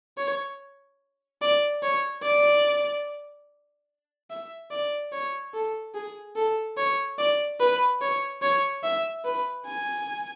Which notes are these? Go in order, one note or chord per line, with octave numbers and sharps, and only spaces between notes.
C#5
D5
C#5
D5
E5
D5
C#5
A4
G#4
A4
C#5
D5
B4
C#5
C#5
E5
B4
G#5